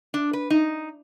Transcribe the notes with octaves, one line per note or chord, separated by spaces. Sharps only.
D4
B4
D#4